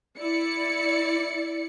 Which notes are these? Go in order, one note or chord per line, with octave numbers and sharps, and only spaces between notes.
E4 D5 C#7